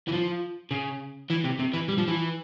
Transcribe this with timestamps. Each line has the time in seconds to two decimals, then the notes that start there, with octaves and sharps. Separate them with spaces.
0.08 E3
0.12 F3
0.71 C#3
1.30 E3
1.44 C3
1.59 C3
1.73 E3
1.88 G3
1.98 F3
2.08 E3